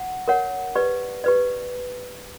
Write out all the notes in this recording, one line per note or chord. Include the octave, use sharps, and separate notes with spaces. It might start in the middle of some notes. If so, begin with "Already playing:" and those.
Already playing: F#5
A#4 C#5 F#5
G4 B4 D5
G4 B4 D5